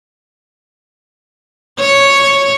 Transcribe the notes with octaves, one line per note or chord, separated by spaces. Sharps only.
C#5